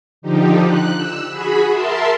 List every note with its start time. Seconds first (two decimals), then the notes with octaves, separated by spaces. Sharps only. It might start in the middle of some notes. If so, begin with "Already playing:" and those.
0.22 D3 F3 D#4 G4
0.64 F#6
0.97 E6
1.29 F#4 G#4 B5
1.70 A#4 E5 A5 C6